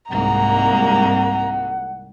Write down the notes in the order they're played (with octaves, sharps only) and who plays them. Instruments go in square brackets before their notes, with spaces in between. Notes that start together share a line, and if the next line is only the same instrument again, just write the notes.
[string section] C2 G#2 [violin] A#3 [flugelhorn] F#5 [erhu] A#5